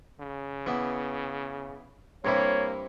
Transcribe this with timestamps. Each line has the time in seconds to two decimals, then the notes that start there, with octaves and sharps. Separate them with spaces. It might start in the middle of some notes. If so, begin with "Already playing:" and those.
0.20 C#3
0.66 E3 B3
2.25 G2 C3 A#3 E4 C#5